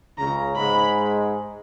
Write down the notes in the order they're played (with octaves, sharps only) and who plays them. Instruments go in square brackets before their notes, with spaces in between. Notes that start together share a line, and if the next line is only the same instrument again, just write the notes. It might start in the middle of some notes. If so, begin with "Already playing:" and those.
[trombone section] C#2 C#3 [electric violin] A#5
[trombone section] G#2 G#3 [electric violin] B5